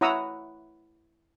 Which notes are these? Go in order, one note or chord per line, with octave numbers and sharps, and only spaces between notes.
E4 C#5 F#5 A#5 D#6 E6